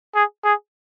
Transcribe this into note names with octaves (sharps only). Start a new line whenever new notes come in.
G#4
G#4